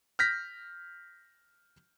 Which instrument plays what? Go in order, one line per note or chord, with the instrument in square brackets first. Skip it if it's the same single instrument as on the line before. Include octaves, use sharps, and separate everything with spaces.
[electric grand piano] F6 G6 A#6 B6